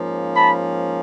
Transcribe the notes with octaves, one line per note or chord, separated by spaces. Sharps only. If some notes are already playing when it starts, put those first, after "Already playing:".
Already playing: G#2 F3 A#3 C#4
A5 B5